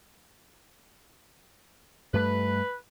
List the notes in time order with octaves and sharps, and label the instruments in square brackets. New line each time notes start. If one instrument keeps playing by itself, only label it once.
[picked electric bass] G2 G3 A3 [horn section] B4